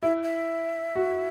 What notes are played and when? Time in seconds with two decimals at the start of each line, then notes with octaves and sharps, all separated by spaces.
0.03 E4 E5
0.23 E5
0.96 F#4